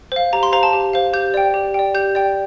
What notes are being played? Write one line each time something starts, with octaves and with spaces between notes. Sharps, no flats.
C5 F5
G4 A#5
C6
C5 F5 A#5
A5
G4
C5 F5
G4 G6
D5 G5
G4
D5 G5
G4 G6
D5 G5